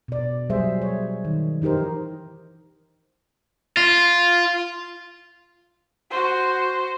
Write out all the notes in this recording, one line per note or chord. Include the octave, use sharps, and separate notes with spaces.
B2 D5
F#3 G3 G#4 C5 E5
C#5
D#3
E3 D#4 G4 A#4 C5
F4
F#4 C5